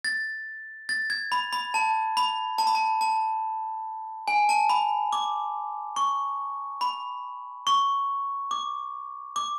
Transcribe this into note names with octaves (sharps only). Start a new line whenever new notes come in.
A6
A6
G#6
B5
B5
A5
B5
A5
B5
A5
A5
G#5
A5
B5
D6
C#6
B5
C#6
D6
D6